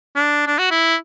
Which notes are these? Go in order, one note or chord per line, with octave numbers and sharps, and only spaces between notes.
D4
D4
F#4
E4